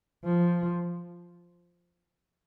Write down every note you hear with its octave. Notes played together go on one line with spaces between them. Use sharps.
F3